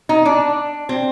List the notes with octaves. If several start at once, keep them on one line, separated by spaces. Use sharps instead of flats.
D#4
D4
C4